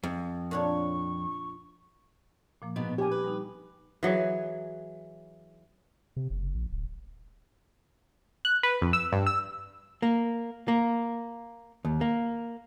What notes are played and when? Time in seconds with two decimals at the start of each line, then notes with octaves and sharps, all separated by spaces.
0.03 F2
0.51 A#2 D4 C#5 C#6
2.62 A#2 F3 A#3
2.76 G#2 B2 B3
2.98 D4 G4 A#4 C#5 G#5
3.11 B4
3.24 G3 D#4
4.03 E3 F#3 G#4
6.16 C3
6.30 F#1
6.54 A#1
6.71 D1
8.45 F#6
8.63 B4
8.82 F2
8.93 E6
9.13 G2
9.27 E6
10.02 A#3
10.68 A#3
11.85 D#2
12.01 A#3